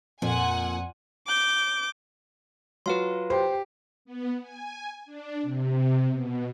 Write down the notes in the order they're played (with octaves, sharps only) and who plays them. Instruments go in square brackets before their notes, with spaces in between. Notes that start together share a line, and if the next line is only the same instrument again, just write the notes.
[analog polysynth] F2 [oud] A#2 [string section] F#5 G#5
[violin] D6 G6
[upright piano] F#3 F4 F#4 [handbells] B4 F5 C6
[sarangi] G4 [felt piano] C5
[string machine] B3
G#5
D4
C3
B2